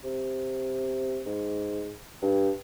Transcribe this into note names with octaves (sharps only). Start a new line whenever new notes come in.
C3
G#2
G2